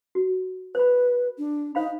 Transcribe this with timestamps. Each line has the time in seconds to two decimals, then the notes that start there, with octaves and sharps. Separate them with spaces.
0.15 F#4
0.75 B4 C5 B5
1.38 D4
1.75 D#4 C5 F5 B5